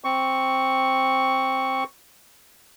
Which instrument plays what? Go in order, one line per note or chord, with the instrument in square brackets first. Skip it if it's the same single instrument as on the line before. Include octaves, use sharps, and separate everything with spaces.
[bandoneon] C4 C#6